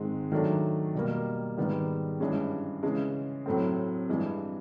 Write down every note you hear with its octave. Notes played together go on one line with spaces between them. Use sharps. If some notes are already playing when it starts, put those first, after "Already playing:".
Already playing: G#2 D#3 G#3 C4
D#3 F#3 A3 D4
B2 G3 A#3
G#2 D#3 G3 B3
G2 E3 G#3 C#4
C#3 E3 G#3
A2 F#3 A3 C4
G2 E3 G#3